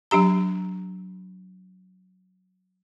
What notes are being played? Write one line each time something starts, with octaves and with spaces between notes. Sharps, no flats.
F#3 D4 G4 A#5